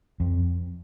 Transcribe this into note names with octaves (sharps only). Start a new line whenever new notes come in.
F2